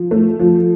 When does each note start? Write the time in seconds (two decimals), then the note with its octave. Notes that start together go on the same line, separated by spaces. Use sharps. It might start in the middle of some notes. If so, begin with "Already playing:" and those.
Already playing: F3
0.11 A3
0.39 F3